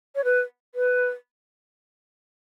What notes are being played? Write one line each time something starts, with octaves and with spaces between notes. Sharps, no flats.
C#5
B4
B4